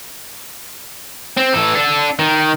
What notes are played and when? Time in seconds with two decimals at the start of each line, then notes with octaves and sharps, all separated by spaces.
1.37 C4
1.54 E3 A4
1.75 D4 A4
2.19 D#3